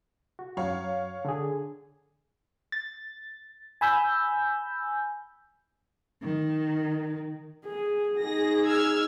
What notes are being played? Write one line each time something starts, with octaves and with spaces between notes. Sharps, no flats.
F#4
F#2 F#3 C#5 F5
D3 G#4
A6
G#5 B5 E6 G6
D#3
G#4
D#4 G#4 A#6
E6 F6 G#6